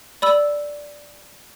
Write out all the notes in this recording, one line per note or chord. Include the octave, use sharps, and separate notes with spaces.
D5 B5 E6